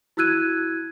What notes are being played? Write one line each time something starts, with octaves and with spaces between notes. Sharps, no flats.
E4 F#4 E6 F#6 G#6 D#7